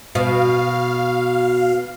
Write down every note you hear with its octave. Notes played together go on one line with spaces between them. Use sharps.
B2 F5